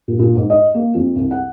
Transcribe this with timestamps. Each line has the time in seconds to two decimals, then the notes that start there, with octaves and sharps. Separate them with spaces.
0.08 A#2
0.19 A#2
0.35 G#2
0.50 D#5
0.74 A#3
0.95 F2
1.16 C2
1.31 F#5